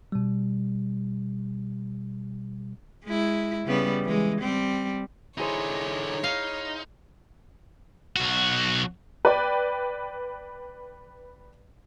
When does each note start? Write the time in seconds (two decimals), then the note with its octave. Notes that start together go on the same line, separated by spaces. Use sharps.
0.12 B2 G3
3.04 G#3 E4
3.66 C#3 G3 B3
4.04 E3 G#3
4.41 G3 C4
5.38 D3 D#4 E4 G#4 C5 C#5
6.24 D#4 F5
8.16 B1 F#4
9.25 B4 D5 G5